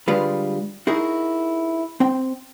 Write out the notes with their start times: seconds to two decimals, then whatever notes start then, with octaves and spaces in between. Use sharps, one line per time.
0.08 D3 G3 G#3 F4 B4
0.87 D#4 E4 F#4 G#4 A#4
2.00 C4 G5